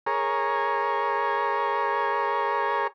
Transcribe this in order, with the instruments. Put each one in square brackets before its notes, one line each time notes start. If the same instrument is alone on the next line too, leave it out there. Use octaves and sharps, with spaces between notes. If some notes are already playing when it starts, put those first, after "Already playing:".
[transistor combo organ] G#4 A#4 C#5